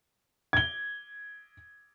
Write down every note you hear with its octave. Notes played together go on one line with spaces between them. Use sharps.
G#6 G7